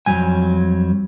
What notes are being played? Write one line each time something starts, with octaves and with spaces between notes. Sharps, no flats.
F2 B2 F#3 G3 G#5